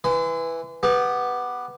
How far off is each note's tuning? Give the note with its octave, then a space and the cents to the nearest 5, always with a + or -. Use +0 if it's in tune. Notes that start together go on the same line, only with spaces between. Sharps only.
E3 +0 C6 -40
B3 +0 G4 +10